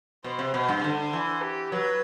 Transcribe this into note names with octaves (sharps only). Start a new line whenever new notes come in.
B2 C5
C3
B2 C5
G2
C3
D3
E3
G4
F#3 B4